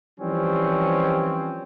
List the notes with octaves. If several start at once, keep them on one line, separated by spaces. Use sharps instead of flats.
E3 F3 G3 C4 C#4